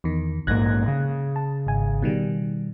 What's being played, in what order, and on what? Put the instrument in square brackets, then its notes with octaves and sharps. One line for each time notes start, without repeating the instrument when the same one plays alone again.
[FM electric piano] E2 D#3
[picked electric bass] A#1 G#2 A#3 [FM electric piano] F#6 G#6 A#6
[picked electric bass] C#3
[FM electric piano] A5
G#1 G#5
B2 D#3 G3